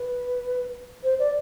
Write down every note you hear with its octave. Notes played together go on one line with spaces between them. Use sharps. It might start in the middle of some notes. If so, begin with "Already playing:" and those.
Already playing: B4
C5
D5